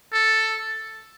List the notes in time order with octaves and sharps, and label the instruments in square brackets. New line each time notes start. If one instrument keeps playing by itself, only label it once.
[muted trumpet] A4